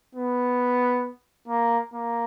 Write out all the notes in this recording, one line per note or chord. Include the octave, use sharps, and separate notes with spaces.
B3
A#3
A#3